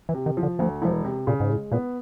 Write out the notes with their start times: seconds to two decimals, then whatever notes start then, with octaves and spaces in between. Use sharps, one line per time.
0.09 E3
0.14 C3
0.26 D#3
0.37 F3
0.43 D3
0.59 D2 F3
0.82 E1 F3
0.93 E3
1.05 C3
1.27 A#2 C#3
1.40 G#2
1.50 A2 G#3
1.72 A#2 B3